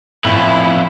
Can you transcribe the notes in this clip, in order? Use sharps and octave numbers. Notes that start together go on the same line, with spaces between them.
F2 A2 E3 E4